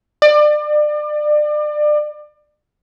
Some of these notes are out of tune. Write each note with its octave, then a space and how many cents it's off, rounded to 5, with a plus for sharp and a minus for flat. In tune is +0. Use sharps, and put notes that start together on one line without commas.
D5 +30